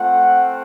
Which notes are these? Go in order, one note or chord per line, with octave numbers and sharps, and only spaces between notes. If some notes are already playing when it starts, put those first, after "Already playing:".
Already playing: A3 C4 F4 F#5